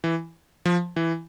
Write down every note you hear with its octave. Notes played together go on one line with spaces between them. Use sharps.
E3
F3
E3